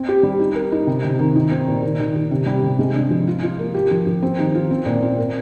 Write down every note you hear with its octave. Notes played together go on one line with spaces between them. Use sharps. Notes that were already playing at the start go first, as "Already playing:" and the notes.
Already playing: C4
G4
G3
D#4
A#4
D#4
C3
C3
D#3
D#4
C4
A#2
D#3
D#3
D#3
C3
G3
C3
G#3
D4
F3
F4
F4
A#3
G4
F3
F3
C4
D#3
F4
C4
A#2
C4
A#3